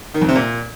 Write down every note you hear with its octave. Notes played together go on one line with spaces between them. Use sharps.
D#3
F2
C3
A#2